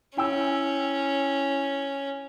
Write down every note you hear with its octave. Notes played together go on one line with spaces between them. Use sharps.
C#4 E4 G5 E6